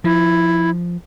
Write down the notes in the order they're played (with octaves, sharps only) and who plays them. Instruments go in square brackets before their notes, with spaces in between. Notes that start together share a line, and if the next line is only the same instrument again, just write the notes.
[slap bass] F3 [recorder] E4